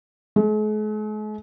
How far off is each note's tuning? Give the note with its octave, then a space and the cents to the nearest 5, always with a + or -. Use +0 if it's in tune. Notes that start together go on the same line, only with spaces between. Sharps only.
G#3 +45